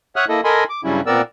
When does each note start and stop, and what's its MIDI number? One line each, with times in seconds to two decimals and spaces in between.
0.16 0.25 73
0.16 0.25 76
0.16 0.25 78
0.16 0.25 87
0.16 0.25 89
0.16 0.25 90
0.29 0.41 58
0.29 0.41 64
0.29 0.41 69
0.29 0.41 75
0.44 0.64 69
0.44 0.64 70
0.44 0.64 75
0.44 0.64 80
0.44 0.64 83
0.44 0.64 84
0.69 0.81 86
0.84 1.01 43
0.84 1.01 49
0.84 1.01 54
0.84 1.01 55
0.84 1.01 61
0.84 1.01 64
1.07 1.22 46
1.07 1.22 59
1.07 1.22 60
1.07 1.22 70
1.07 1.22 74
1.07 1.22 88